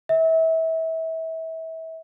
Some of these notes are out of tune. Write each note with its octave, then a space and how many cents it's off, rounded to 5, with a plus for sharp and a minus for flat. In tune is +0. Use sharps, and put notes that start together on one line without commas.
E5 -30